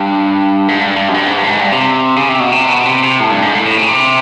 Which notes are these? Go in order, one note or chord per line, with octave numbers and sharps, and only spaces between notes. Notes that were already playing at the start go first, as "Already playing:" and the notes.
Already playing: G2
G#2
G2
G2
F#2
G2
G#2
G2
A2
G#2
G2
C3
C#3
C3
B2
C3
B2
C3
C3
A2
G2
G#2
A2
A2
C3
C#3
C3